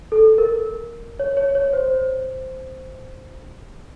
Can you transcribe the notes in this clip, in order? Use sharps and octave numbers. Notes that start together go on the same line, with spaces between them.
A4
A#4
C#5
C#5
C#5
C5